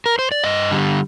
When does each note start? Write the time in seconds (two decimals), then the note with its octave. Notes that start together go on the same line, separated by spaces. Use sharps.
0.06 A#4
0.19 C5
0.32 D5
0.44 G2 D#5
0.71 D3 G3